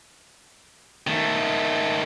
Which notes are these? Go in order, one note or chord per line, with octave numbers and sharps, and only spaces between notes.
D#3 A3